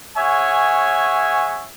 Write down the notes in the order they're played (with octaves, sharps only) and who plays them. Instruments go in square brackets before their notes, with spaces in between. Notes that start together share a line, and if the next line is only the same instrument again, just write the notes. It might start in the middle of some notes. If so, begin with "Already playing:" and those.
[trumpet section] C#4 G#4 C#5 E5 F#5 G#5